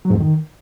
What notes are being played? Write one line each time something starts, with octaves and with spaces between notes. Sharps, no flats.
F#3
G#2
F2
D#3